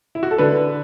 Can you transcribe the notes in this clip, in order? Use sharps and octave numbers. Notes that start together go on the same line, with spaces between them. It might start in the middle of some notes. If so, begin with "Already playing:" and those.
E4
F#4
A4
D3 B4